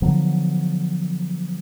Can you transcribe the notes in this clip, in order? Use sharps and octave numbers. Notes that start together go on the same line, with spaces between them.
D3 F3 F#3 B3